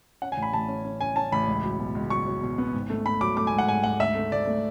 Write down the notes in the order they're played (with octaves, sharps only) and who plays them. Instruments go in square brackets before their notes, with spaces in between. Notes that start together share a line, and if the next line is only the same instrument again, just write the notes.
[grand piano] C#4 F#5
G#5
A1
B5
A1 A5
C#4
C#4
C#4 G#5
C#4 A5
A1 B5
C#2
F#3
B2
C#2
F#3 C#6
F#3
B2
B3
G#1
A3
A3 B5
F#3 D6
A3 D6
G#5
G#2
F#5
G#2 G#5
G#2 F#5
D2 E5
A3
D2 D5
A3